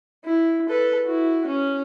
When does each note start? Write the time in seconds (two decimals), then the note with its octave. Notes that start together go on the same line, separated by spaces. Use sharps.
0.25 E4
0.69 A4 B4
1.06 E4 F#4
1.47 C#4